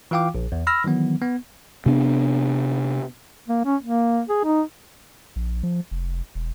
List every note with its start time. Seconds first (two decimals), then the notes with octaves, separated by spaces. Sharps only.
0.11 E3 F4 F5 G5 D6
0.35 A#1
0.52 E2
0.67 B5 E6 F6 A#6
0.84 D#3 E3 F#3 B3
1.22 B3
1.86 C3 B3 D4
3.48 A#3
3.65 C#4
3.83 A#3
4.29 G#4
4.44 D#4
5.36 A#1
5.63 F3
5.91 F1
6.35 E1